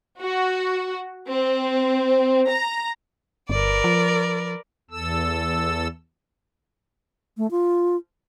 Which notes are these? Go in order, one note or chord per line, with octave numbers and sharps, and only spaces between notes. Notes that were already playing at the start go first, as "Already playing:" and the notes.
F#4
C4
A#5
G1 A#4 B4 D5
F3
E2 A4 E6
A3
F4